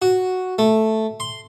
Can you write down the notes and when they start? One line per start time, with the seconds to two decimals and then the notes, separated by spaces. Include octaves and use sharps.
0.02 F#4
0.58 A3
1.20 C6